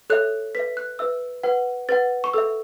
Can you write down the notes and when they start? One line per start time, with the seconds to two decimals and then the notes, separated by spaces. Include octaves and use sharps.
0.10 A4 C#5 E5 F#6
0.55 B4 E5 B6
0.77 F#6
0.99 B4 E5 E6
1.43 B4 F#5
1.89 B4 F#5 A6
2.24 C#6
2.34 A4 E5 E6